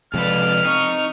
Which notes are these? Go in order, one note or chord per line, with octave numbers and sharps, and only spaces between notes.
F2 C3 F3 G#3 A4 B4 D5 F6
C4 D#4 C#6